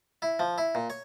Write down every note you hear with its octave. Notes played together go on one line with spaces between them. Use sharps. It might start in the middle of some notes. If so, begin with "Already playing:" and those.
E4
F3
E4
A#2
C#5